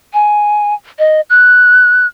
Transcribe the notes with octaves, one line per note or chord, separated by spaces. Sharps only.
G#5
D#5
F#6